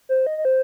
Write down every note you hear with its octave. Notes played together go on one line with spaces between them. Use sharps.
C5
D#5
D#5
C5